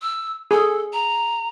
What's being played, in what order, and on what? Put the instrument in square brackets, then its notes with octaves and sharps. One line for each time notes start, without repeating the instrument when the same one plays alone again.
[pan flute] E6
[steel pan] G#4 [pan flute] A4
[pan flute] A#5